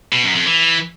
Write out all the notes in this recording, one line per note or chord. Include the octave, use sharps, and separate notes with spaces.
B2
F#2
F2
E3